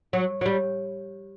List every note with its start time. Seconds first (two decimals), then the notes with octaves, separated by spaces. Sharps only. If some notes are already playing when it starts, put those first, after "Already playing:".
0.13 F#3
0.41 F#3
0.46 G3